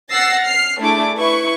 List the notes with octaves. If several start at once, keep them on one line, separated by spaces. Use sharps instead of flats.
F#5 E6 A6 A#6 C7
F6 C7
A3 D4 E4 G#4 D6
E4 B4 C#6